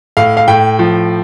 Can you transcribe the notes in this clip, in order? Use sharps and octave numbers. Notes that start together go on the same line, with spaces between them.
A2 F5
F5
A2 G5
F3